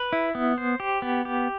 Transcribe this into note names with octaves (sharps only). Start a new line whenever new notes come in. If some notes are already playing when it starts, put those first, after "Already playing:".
Already playing: B4
E4
B3
C5
G4
B3
G4